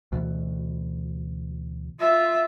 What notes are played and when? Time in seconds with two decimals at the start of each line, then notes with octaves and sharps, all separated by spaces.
0.12 D2 B2 E3
1.99 F4 E5